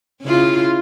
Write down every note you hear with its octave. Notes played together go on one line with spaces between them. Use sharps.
C#3 E4 F4